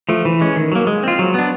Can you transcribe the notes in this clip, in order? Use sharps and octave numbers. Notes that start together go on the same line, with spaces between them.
F3 A3
E3
G#3 C#4
D#3
F#3 A#3
G#3
C4 F4
F#3
B3 D4